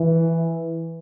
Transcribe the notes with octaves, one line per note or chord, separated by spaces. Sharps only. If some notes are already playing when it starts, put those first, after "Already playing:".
Already playing: E3